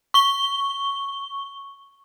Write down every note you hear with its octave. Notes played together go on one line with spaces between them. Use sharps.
C#6 G7